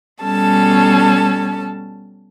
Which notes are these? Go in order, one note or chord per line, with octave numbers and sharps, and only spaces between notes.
B2 G3 C#4 A4 A5